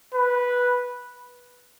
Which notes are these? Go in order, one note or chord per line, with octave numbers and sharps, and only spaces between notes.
B4